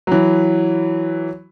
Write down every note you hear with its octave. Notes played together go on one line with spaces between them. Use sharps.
E3 F#3